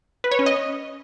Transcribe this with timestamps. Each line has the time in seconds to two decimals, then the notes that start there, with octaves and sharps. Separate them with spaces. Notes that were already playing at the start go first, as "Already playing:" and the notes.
0.24 B4
0.31 C#5
0.39 C#4
0.46 D#5